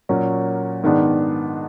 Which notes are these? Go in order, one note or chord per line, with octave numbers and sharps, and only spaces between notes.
A#2 F#3 A#3 C#4
G#2 D#3 G#3 B3 D4